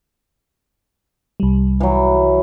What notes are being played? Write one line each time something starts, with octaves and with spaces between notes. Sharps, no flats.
C2 G3
E3 F#3